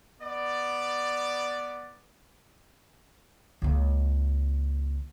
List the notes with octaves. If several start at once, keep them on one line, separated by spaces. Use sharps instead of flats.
B3 D5
C#2 A#3